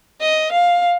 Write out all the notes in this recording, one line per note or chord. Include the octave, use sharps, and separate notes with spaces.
D#5
F5